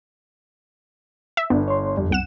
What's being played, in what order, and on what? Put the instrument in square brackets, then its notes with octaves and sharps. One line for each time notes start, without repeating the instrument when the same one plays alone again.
[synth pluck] E5
[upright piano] G1 [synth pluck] B3 [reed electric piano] D4
[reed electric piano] C#5 C6
[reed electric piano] F2 [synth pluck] G3
[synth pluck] C2 F#5 E7